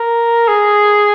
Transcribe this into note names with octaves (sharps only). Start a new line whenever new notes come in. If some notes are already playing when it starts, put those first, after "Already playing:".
Already playing: A#4
G#4